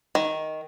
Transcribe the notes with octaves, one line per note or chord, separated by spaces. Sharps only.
D#3